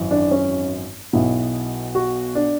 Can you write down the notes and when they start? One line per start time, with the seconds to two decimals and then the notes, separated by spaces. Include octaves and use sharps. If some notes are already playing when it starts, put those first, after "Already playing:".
Already playing: G#1 F#2 E3
0.11 D4
0.31 C#4
1.13 B1 B2 E4
1.95 F#4
2.35 D4